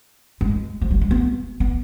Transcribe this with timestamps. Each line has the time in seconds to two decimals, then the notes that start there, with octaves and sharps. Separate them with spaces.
0.41 G#3
0.81 F3
0.91 F#3
1.01 G#3
1.11 B3
1.60 B3